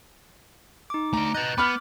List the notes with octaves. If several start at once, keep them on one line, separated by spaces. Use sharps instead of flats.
D#4 D6
A3 D5 A#5
B4 D#5 F#6 G6 A6
B3 B5 D6 F6